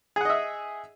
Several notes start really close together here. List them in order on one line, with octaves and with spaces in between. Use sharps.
G#4 F#5 D#5 E5